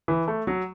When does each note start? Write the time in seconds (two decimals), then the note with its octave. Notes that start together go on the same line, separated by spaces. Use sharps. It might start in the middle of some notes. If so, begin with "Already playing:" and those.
0.08 E3
0.28 A3
0.47 F#3